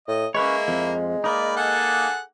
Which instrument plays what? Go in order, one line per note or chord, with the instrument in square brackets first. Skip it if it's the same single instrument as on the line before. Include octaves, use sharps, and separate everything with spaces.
[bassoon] A2 [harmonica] D#5
[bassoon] G#3 [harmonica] A#3 E4 [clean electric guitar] C#4 B4 C#5
[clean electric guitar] F2
[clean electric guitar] A#3 D#4 [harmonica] B4 D5
[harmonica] G#4 A4 F#5